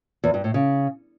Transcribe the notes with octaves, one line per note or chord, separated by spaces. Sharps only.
E2
G2
A2
C#3